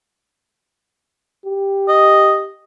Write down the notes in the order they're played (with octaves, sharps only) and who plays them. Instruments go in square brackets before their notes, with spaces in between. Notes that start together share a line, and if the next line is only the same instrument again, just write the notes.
[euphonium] G4
[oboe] D#5